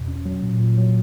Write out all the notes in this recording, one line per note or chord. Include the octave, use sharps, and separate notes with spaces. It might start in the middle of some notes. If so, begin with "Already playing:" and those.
Already playing: E2 B2
C#4
F#3
A#2
A#2
F#3